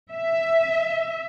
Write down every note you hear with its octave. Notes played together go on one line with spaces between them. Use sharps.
E5